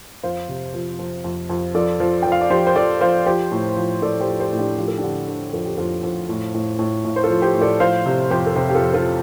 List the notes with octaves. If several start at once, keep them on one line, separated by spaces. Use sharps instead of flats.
F2 C5 F5
C3
F3
F2
F2
F2
F3 A4 D5
F3
F3 G5
F5
D5
F3 G4 C5
C5
F3 A4 D5
F3 C5 F5
F3 G4 C5
A2
F3
A2 A4 D5
G4 C5
F3
G4 C5
A2
D4 G4
F3 G4
A4
D3 D4 G4
D3
F2 A4
G4
F2 F4 A4
F2
A2
A2
A2
A2
C5
F4 A4
F3
G4 C5
A2
A4 D5
F3 C5 F5
C3
F2 G4 C5
A4
C3 G4 C5
G4
F4 A4
F2
F4 A4